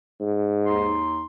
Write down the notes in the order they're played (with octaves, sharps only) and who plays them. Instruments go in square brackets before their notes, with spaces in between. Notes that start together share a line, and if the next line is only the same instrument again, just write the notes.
[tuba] G#2
[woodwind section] D#2 D#4 C6